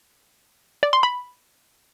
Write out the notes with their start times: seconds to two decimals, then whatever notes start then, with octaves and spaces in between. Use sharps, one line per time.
0.83 D5
0.93 C6
1.03 B5